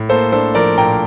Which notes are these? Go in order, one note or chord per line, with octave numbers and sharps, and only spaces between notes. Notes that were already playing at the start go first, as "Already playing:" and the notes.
Already playing: A2
A#3 A4 C5
D4 A4 C5
F3 A#4 D5
A#2 G5 A#5